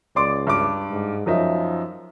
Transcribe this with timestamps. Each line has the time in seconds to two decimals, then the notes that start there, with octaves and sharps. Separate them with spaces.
0.16 C#2 D5 C6 D6
0.47 G2 D6
0.90 G#2
1.26 F#2 F3 D#4 E5